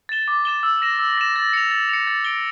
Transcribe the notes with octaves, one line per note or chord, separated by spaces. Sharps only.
A6 E7 G7
D6
A6 E7 G7
E6
A#6 E7
E6
A#6 E7
A6
C#7 F7
A6
C#7 F7
A6
D7 G7